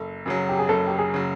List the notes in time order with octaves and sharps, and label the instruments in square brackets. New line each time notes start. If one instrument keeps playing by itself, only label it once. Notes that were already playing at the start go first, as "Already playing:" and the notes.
Already playing: [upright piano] F#1 [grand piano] A4
[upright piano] F#2 C#3 F#3
[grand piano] G4
G#4
[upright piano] F#1 [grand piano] A4
[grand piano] G4
G#4
[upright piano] C#3 F#3